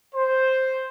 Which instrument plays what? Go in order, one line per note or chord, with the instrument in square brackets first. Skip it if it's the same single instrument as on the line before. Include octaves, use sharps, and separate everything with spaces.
[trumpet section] C5